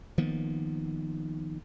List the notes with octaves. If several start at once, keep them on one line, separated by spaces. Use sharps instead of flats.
D#3 F3 A#3 B3